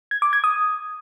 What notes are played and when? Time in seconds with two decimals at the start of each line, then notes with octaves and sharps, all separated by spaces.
0.11 G#6
0.22 D6
0.33 G#6
0.44 D#6